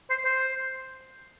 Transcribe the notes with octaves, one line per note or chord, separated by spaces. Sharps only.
C5
C5